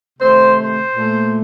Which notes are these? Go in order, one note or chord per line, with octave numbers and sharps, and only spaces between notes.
C3 D#3 A3 C5
C5
A#2 A3